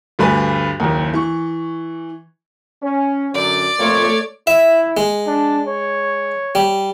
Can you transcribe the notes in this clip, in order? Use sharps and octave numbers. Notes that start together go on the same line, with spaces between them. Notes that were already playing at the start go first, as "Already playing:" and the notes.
D2 G2 B4 G#5
F#1 D#2
E3 C#6
C#4
F#2 D3 A#4 D5
F2 A3 A#3 F4 C#5
E4 E5
G#3
D4
C#5
G3